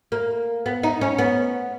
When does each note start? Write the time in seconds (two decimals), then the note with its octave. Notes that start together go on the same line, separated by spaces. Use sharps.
0.12 A#3
0.66 B3
0.83 D#4
1.01 C#4
1.18 B3